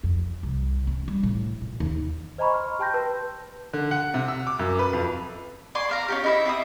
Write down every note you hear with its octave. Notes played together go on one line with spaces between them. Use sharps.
F2
C2
C#4
G3
A2
A#2
D#2
C5 D#5 G#5 A#5 B5 C#6
C6 F6
G4 G5 A5 C6 G6 A#6
B4 A5
D3
F#5
C3
E6
D6
F#2
B4
F2
D5 G#5 C6 C#6
E5 F5 A#5
C#4 D#4 G4
D#4 E4 E5
C4 E4 E5 D#6